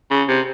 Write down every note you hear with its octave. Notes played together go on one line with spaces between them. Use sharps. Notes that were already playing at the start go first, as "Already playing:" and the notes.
C#3
C3